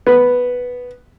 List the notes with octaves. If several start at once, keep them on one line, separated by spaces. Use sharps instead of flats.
B3